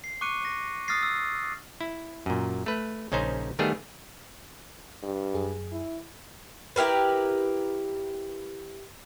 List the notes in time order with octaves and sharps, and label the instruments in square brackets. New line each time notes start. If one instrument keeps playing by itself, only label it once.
[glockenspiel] C7
C#6 D6 F#6 C#7 D#7
A#6
D#6 F6 F#6 A6 A#6 C7
E6
[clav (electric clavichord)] E4
F#2 A#2
A3 B4
A#1 C#3 C#4 D#4 C5
D#3 G3 A3 B3 G#4
[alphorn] G2
[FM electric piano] F#2 G#4
[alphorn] E4
[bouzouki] E4 G4 A#4 B4